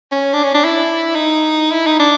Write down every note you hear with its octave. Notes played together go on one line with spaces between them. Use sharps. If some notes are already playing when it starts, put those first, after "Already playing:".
C#4
D4
C#4
D4
E4
D#4
E4
D#4
D4